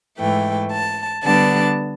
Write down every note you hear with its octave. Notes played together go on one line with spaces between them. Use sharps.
G#2 E3 A3 G5
A5
D3 G3 B3 D4 A5